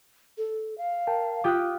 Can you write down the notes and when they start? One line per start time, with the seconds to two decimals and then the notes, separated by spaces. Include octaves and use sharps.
0.38 A4
0.78 F5
1.07 A#4 G5 A5
1.44 F4 G4 G5 D6 D#6 F#6